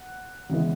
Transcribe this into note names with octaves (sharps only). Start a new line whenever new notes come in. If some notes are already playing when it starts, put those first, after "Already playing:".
Already playing: F#5
E2 C#3 E3 G#3 B3